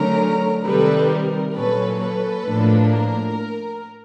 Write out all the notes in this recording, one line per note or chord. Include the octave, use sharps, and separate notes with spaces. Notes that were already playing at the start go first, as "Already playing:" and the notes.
Already playing: D3 F#3 A3 C#4 A#4
C3 D#3 G3 A4 B4
A#4
A#2 F#3 A#3 C#4 A4 B4
A4 B4
A2 F3 A#3 D4
A#4